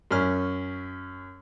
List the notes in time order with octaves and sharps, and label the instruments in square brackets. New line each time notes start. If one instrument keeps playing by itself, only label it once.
[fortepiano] F#2 C#4 F6